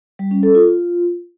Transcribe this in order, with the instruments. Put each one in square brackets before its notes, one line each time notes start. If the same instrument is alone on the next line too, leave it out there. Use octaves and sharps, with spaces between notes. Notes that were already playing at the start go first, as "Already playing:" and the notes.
[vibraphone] G3
C#4
A4
F4